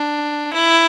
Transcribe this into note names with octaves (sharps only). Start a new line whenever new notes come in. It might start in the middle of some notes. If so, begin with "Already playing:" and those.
Already playing: D4
E4